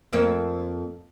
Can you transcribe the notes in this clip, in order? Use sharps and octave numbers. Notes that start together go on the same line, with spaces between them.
F2 A#3 C4